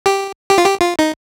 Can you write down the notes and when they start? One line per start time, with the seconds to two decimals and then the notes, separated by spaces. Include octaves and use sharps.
0.06 G4
0.50 G4
0.58 F4
0.65 G4
0.81 F4
0.99 D#4